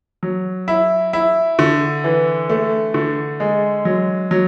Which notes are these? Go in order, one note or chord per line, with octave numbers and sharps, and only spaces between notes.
F#3
E4
E4
D3
E3
A3
D3
G#3
F#3
F#3